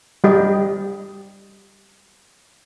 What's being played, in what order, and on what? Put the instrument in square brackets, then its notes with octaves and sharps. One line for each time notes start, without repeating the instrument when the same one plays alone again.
[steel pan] G3 G4 D#5